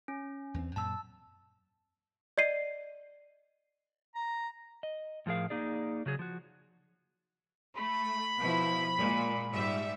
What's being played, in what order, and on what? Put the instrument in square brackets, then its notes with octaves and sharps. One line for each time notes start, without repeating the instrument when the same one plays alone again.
[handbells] C#4
[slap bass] E2 A#3 C4
[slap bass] F#2 A#2 [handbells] A5 E6
[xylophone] D5 D#5 C7 D#7
[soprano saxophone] A#5
[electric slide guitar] D#5
A2 F3 A3 G#4 A#4 F5
A#3 D#4 G#4 D5
C#3 F#3 G#4
F3 F#4
[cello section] A3 [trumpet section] B5
[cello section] B2 F3 E4
A#2 G#3
G#2 G3 E5